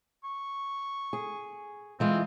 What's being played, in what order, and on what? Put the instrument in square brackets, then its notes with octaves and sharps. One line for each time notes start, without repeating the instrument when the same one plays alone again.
[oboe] C#6
[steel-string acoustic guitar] G#4
[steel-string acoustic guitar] E3 G#3 F4 [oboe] C4